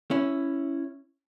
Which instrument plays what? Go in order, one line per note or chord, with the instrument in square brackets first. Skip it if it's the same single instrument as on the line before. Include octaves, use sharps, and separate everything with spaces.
[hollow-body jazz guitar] C#4 E4